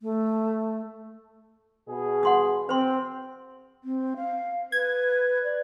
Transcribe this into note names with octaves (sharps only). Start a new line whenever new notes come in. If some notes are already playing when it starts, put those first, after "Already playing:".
A3
B2 G#4
F#5 C6 D#6
C4 C5 C6
C4
F5
B4 G#6
D5